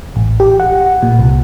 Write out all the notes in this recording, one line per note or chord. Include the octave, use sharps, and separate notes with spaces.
A1
G4
F#5
A#2
C2